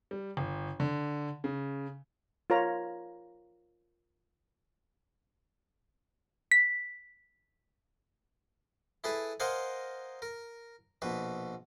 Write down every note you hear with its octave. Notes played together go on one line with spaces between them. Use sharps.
G3
G1
D3
C#3
F4 A#4 C#5 A#5
B6
E4 G#4 A4 B4
A#4 C5 D#5 F5 F#5 G#5
A#4
A#1 B2 B4